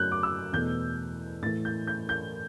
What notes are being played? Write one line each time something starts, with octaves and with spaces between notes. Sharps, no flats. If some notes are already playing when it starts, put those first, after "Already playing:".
Already playing: F#2 C#3 F#3 A3 F#6 G6
D6
E6
E2 B2 A3 G6
A2 E3 A3 A6
G6
G6
G6